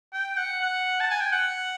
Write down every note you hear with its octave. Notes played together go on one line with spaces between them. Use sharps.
G5
F#5
F#5
A5
G#5
G5
F#5